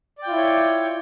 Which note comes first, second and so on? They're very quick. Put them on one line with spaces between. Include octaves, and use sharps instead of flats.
D5 G5 F4 E4 C#5